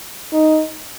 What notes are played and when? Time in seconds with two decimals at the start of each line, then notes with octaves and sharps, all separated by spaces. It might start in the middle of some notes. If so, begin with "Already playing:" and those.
0.33 D#4